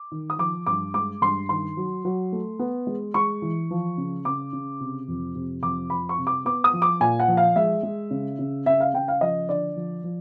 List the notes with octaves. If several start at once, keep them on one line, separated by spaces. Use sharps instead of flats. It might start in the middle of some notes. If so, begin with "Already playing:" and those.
Already playing: D6
D#3
D#6
F3 D6
G2 D6
G#3 D6
G2 C6
D#3 C6
F#3
F#3
A3
B3
G#3
G#3 C#6
E3
F3
C#3
C#3 D6
C#3
C3
F2
C3
F2 D6
F3 B5
C#6
C3
D6
B3 D6
D#6
F3
D6
A#2 G#5
F#5
F3
F5
G#3 E5
G#3
C#3
C#3
C#3 E5
F5
C#3 G5
F5
F3 D#5
D3 D5
F3
F3